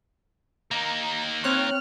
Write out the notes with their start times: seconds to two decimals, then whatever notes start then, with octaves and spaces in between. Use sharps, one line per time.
0.71 A#3 D#4 A#5
1.44 C4 C#5 F6 F#6